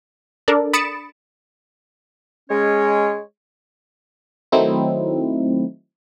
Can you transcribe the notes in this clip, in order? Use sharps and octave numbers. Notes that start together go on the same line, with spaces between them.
D4 A4 A#4 D5
B5 D#6 A6 C#7 D7 E7
G#3 C#4 C#5
D#3 F#3 A3 C4 D#4 E4